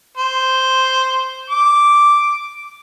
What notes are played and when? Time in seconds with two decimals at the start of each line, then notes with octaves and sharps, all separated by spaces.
0.17 C5
1.50 D6